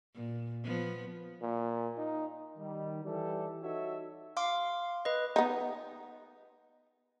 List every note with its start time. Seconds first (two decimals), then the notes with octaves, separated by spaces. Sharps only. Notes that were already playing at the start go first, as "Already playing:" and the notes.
0.15 A#2
0.64 F3 B3
1.42 A#2
1.97 D#4
2.58 D#3 G3
3.05 E3 G3 G4 A4
3.62 D#4 F#4 A4 C#5 E5
4.37 F5 C6 D6
5.05 B4 D#5
5.36 B3 D#4